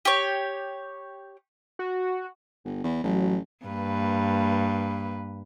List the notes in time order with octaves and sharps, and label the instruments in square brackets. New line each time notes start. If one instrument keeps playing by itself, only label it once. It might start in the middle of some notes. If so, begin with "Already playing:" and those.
[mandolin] G4 C#5
[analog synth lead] F#4
[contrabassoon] G1
E2
[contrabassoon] A1 [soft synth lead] F#3
[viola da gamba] G2 A#3 B4